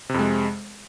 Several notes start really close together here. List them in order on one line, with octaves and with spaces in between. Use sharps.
C3 F2 G#3